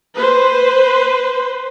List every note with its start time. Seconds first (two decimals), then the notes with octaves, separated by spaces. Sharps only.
0.14 B4 C5